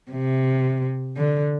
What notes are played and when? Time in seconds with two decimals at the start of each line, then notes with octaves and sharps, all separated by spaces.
0.11 C3
1.17 D3